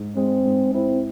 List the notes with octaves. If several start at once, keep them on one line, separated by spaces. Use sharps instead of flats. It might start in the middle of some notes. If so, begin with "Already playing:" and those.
Already playing: G#2
G#3 C4
G#2
C4 E4